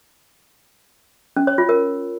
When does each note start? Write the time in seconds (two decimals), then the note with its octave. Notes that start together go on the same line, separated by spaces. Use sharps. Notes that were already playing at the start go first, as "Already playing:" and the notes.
1.36 C#4
1.47 C#5
1.58 F4
1.69 A#4